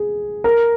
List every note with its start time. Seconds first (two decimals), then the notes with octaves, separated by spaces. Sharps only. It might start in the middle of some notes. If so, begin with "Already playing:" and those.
Already playing: G#4
0.44 A#4